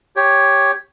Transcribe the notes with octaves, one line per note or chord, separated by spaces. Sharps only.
G4 C#5